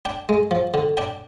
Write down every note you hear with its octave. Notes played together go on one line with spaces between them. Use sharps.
D4 G5
G#3
F3
D3
D4 G5